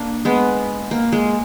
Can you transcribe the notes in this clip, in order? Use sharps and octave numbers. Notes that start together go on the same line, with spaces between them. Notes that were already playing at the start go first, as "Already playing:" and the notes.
Already playing: A#3 D4
G#3 B3
A#3
G#3